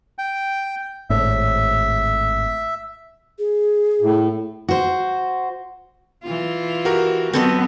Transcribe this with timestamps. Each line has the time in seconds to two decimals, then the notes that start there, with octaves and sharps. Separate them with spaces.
0.18 G5
1.10 G#1 A2 E5
3.39 G#4
4.02 A2
4.69 F#4 C5
6.23 E3 F4
6.85 F#4 G4 A#4
7.33 F#3 B3 C4 A4 D#5